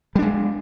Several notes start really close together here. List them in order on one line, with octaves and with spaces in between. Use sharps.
G3 D4 G#3